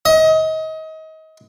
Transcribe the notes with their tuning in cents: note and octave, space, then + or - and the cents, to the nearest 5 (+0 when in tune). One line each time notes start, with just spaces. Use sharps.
D#5 +30